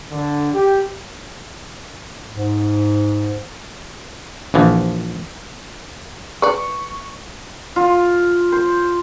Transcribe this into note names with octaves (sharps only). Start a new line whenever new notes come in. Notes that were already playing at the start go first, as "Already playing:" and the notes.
D3
G4
G#2
A#1 E3 F3
B4 D5 C#6
F4
C5